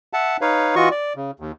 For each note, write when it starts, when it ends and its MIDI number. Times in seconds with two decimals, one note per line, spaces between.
0.13 0.37 76
0.13 0.37 78
0.13 0.37 81
0.41 0.75 63
0.41 0.75 71
0.41 0.75 73
0.41 0.75 77
0.75 0.89 52
0.75 0.89 65
0.75 0.89 66
0.75 0.89 75
0.75 0.89 85
0.91 1.13 74
1.16 1.31 49
1.40 1.52 39